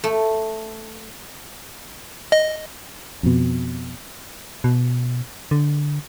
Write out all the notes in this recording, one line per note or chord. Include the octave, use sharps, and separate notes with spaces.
A3
D#5
F2 B2
B2
D3